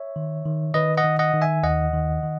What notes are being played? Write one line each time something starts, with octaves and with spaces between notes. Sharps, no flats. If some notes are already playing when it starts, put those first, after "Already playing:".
Already playing: C#5 E5
D#3
D#3
D#3 B4 D#5
D#5 F#5
D#3
D#5 F#5
D#3
E5 G#5
D#2 D#5 F#5
D#3
D#3